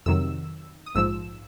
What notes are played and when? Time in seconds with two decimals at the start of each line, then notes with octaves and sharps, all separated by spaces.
0.06 F2 C3 D#3 F#3 E6
0.86 D#6
0.95 A#1 G#2 F3 E6